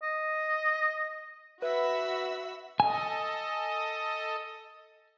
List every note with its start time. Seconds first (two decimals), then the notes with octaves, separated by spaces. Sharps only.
0.03 D#5
1.62 F#4 B4 E5 B5 E6
2.80 A4 D#5 G#5